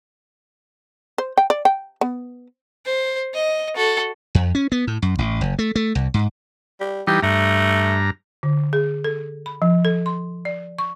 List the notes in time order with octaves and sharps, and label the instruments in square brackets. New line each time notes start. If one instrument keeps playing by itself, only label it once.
[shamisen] C5
G5
D5
G5
B3
[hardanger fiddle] C5
D#5
F#4 A4
[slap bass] F2
C#4
B3
A2
F#2
A1
F#1
A3
A3
C2
G#2
[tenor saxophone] G3
[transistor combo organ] E3 G3 D#4 [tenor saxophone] G4
[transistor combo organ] G2 A#5 [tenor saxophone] A3
[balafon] D3
G#4
A4
B5
F3
A4
C6
D5
C#6